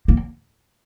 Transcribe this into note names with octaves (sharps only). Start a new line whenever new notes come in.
A#3